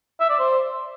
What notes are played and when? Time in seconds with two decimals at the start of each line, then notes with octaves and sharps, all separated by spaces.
0.20 E5
0.30 D5
0.39 C5